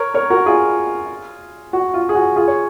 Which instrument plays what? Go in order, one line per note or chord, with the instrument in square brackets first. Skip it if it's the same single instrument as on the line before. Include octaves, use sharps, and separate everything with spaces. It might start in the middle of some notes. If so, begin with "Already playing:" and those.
Already playing: [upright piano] A#4 C#5
A#4 C#5
F#4 A#4
F4 G#4
F#4
F4
G#4
F#4
F4 G#4
C#5